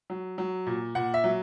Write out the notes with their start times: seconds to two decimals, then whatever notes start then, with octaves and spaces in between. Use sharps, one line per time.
0.10 F#3
0.38 F#3
0.67 A#2
0.95 A#2 F#5
1.14 E5
1.24 F#3